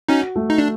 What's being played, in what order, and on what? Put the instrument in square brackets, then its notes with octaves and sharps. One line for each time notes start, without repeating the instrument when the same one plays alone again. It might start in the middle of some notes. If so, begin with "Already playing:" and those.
[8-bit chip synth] C#4 D#4 [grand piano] F#4
[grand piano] A3
[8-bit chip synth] D#4
D4